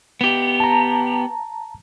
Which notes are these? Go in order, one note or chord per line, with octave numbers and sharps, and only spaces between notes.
B3 G4
A5 A#5